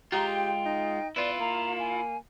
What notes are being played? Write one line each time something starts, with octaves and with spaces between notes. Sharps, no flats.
G#3 F4 G4 A#5
G5
D#4
B3 E4 F4 D5
A#3 A#5
G#5